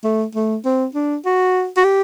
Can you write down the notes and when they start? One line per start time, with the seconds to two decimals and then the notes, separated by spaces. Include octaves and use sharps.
0.04 A3
0.35 A3
0.65 C4
0.95 D4
1.25 F#4
1.77 F#4
1.84 G4